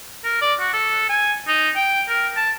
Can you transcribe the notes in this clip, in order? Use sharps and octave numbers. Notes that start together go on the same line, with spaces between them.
A#4
D5
F#4
A4
G#5
D#4
G5
A#4
A5